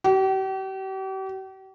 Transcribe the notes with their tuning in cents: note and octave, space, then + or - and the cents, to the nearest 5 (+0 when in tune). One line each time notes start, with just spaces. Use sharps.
G4 -40